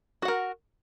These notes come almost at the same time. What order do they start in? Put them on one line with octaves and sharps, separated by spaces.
F#4 F#5 A#4